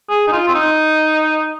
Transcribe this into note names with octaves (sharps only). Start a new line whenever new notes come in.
G#4
D#4
F4
C4
D#4